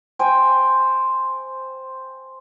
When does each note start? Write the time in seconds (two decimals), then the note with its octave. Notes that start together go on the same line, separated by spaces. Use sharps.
0.19 C5 G5 G#5